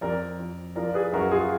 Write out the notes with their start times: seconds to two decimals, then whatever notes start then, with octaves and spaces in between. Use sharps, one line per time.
0.01 F2 A#4 D5
0.39 F2
0.75 F3 A#4 D5
0.88 D5
0.94 G#4 B4
1.13 F#2 F#4 A#4
1.31 F4 G#4